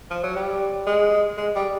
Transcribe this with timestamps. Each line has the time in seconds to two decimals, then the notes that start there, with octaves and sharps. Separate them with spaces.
0.10 F3
0.23 F#3
0.36 G3
0.87 G#3
1.38 G#3
1.55 G3